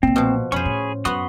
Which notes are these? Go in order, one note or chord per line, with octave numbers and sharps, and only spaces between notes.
B1 A#2 C4
B2 F3
F2 C#4 G#4 C5 B5 C#6
A2
F#2 B3 F#4 B5 C6 D#6